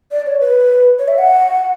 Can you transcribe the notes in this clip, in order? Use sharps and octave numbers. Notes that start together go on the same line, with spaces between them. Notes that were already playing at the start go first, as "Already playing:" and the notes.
D5
C#5
B4
C#5
E5
F#5